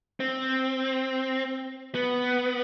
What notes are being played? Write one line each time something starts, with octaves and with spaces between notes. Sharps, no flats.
C4
B3